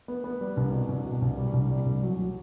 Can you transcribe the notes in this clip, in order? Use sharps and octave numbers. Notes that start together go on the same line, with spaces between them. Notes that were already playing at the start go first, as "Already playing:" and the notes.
B3
B3
G3
C2
B2
C2
B2
C2
G3
C2
G3
C2
F#3
F#3